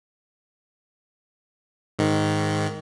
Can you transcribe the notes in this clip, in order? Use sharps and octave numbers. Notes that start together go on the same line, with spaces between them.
G#2 D#3